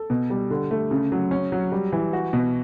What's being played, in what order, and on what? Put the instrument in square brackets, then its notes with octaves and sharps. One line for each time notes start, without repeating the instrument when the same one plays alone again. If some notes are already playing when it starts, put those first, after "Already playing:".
Already playing: [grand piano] A4
B2
G3
D3
A3
C#3
F#3
C#4
F#3
G3
E3
F#4
B2